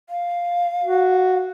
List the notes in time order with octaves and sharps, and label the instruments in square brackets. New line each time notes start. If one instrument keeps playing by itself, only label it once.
[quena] F5
[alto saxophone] F#4